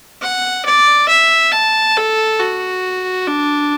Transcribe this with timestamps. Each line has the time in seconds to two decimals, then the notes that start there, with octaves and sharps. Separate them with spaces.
0.22 F#5
0.66 D5
1.09 E5
1.52 A5
1.97 A4
2.39 F#4
3.27 D4